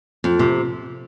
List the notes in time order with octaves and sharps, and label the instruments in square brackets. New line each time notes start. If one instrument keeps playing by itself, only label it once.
[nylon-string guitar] F2
C3